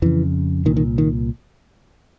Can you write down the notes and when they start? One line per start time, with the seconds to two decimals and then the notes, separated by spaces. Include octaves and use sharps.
0.02 F2 C#3 E3
0.65 C2 A#2 D#3
0.77 D#3
0.98 D#3